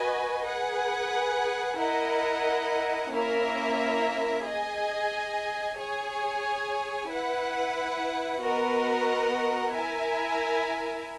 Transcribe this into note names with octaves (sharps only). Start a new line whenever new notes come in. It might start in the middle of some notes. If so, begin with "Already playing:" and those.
Already playing: F#4 B4 D#5 G#5
G#4 B4 F#5
E4 A#4 D#5 F#5
A#3 C#4 E4 A#4 E5
G#4 D#5 G#5
G#4 C#5 G#5
E4 B4 F#5
B3 F#4 A#4 D#5 F#5
E4 A#4 E5 G#5